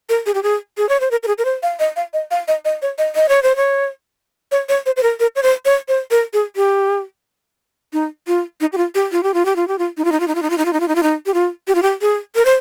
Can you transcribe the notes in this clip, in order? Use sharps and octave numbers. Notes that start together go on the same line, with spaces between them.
A#4
G#4
G4
G#4
G#4
C#5
C5
A#4
A#4
G#4
A#4
C5
F5
D#5
F5
D#5
F5
D#5
D#5
C#5
D#5
D#5
C#5
C5
C#5
C#5
C#5
C5
C5
A#4
A#4
C#5
C5
C#5
C5
A#4
G#4
G4
D#4
F4
D#4
G4
F4
G4
F4
G4
F4
G4
F4
G4
F4
D#4
F4
D#4
F4
D#4
F4
D#4
F4
D#4
F4
D#4
F4
D#4
F4
D#4
G4
F4
G4
F4
G4
G#4
A#4
C5